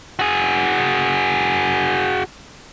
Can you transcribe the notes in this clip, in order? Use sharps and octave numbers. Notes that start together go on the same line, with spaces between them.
F#4 G#4